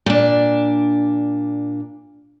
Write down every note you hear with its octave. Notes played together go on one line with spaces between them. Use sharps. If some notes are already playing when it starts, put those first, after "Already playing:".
A#2 D4